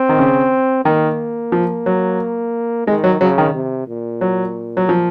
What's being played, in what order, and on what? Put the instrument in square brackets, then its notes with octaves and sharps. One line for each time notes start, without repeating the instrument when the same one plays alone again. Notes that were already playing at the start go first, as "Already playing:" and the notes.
Already playing: [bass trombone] C4
[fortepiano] D#3
C#3
[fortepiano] D#3 [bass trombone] A#3
[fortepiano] F3
F#3
[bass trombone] D#3 [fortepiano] G#3
[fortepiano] F#3
[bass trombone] C#3 [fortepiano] F#3
[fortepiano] D#3
[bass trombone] C3
A#2
[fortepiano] F#3
F#3
F3